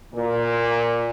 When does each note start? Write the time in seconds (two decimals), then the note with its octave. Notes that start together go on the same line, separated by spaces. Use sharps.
0.14 A#2